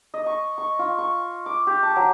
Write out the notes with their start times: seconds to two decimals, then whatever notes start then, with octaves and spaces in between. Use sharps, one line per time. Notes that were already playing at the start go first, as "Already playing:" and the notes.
0.14 D#5
0.26 C#6
0.58 C#6
0.79 F4
0.98 C#6
1.46 D6
1.67 G4
1.83 A5
1.96 F#3